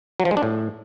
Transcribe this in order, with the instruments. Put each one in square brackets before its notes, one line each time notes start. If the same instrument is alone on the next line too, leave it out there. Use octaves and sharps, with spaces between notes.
[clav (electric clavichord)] F#3
F3
G#3
D4
A2